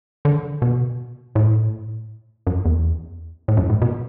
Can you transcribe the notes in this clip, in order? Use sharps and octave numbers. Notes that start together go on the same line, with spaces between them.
D3
B2
A2
F#2
E2
A2
F#2
A2
B2